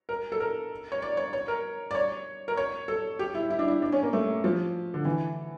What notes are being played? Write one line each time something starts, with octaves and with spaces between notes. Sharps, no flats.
A#4
A4
A#4
C#5
D5
C#5
C#5
A#4
D5
C#5
A#4
C#5
A4
G4
E4
E4
D4
E4
D4
C#4
A#3
A3
F3
D3
E3